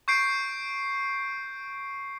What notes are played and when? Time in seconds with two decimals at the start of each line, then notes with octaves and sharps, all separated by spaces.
0.08 C#6 G6 C7 D7